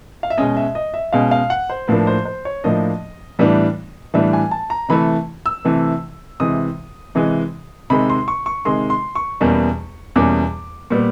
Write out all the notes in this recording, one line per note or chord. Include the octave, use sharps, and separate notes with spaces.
F5
E5
B2 G#3 C#4 D#5
E5
D#5
E5
B2 G#3 C#4 F5
F5
F#5
C5
A2 F3 A#3 D4 B4
C5
C5
C#5
A2 F3 A#3 D4 D#5
A2 E3 G3 B3 D4
A2 E3 G3 B3 D4 E5
G#5
A5
A#5
C3 E3 A3 B5
E6
C3 E3 A3
C3 E3 G#3 D#6
C3 E3 G#3
C3 D#3 G#3 B5
C6
C#6
C#6
C3 D#3 G#3 C6
C6
C#6
E2 B2 G3 A#3 C#4
E2 B2 G3 A#3 C#4 D6
A#2 G3 B3